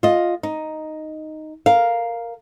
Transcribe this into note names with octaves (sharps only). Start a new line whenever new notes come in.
F4 D#5
D#4
A#4 F5